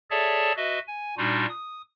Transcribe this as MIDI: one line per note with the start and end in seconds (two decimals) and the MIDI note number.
0.11 0.52 68
0.11 0.52 69
0.11 0.52 73
0.11 0.52 74
0.11 0.52 76
0.11 0.52 81
0.57 0.79 66
0.57 0.79 71
0.57 0.79 75
0.57 0.79 76
0.87 1.15 80
1.18 1.46 46
1.18 1.46 55
1.18 1.46 62
1.18 1.46 63
1.18 1.46 65
1.18 1.46 66
1.49 1.82 87